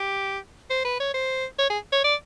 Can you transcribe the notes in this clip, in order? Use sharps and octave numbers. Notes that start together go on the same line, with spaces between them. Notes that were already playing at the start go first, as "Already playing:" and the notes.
Already playing: G4
C5
B4
C#5
C5
C#5
G#4
C#5
D5